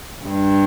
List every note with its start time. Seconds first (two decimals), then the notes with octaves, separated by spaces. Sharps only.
0.25 G2